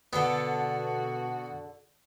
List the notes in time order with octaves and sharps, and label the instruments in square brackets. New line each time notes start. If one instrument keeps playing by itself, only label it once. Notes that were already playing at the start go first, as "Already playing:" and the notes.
[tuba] B2 [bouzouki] D3 D4 A4 [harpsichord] B3 [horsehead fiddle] F#4